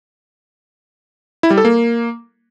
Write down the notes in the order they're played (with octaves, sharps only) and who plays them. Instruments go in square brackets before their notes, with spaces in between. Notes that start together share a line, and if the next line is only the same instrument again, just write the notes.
[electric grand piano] E4
G3
A4
A#3